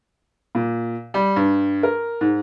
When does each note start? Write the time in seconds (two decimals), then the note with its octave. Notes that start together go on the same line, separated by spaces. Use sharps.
0.55 A#2
1.14 G3
1.36 G2
1.83 A#4
2.21 G#2